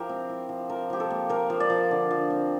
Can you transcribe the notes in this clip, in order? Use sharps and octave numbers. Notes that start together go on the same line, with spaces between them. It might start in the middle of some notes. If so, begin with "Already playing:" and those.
Already playing: F3 E4 G4 A#4
C4
E4
F3
F3 A#4
F3 G4
A4
A#3
A#3 A#4
F3
D5
F3
D3
F3
C4